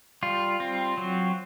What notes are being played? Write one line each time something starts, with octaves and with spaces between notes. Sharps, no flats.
G3 F4
C4
F#3